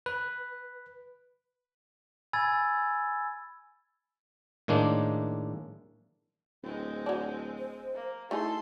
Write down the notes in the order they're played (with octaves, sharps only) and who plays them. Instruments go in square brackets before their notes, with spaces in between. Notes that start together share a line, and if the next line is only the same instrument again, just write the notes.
[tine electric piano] B4
[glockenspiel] G#5 B5 E6 G#6 A6
[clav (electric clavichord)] A2 D#3 G#3 A#3 D4
[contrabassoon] D1 [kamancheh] G#3 C4
[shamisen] F#3 D4
[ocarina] C5
[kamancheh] A#3
[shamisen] A3 D#4 G#4 [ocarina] E4 [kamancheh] A4 C6